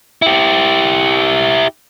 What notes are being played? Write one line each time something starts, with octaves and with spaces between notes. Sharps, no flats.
E4 G4